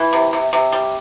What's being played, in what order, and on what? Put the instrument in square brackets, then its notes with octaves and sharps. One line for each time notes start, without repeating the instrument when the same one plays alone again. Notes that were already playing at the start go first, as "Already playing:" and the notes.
Already playing: [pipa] E3
C3
C3
C3
G3